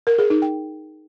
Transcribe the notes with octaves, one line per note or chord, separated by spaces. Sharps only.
A#4
G#4
D#4
G5